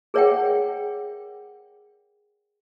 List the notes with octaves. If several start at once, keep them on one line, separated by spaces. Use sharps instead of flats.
G#4 A#4 C#5 E5 F#5 G5